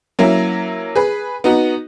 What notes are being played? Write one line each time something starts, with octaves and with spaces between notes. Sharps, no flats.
F#3 A#3 C#4 E4
G#4 B4
B3 D#4 F#4